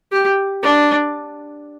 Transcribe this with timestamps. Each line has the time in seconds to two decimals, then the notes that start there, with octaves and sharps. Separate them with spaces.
0.12 G4
0.62 D4